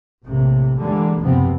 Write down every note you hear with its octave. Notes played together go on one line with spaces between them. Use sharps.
A#1 A2 C3 A#3
D3 E3 G3 G#3 A#3
F#1 D#2 C3 F3 B3 C4